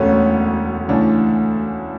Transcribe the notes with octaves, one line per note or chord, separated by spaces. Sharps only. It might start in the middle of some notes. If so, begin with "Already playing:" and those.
Already playing: E1 D2 D3 C#4
D2 C#3 E3 D4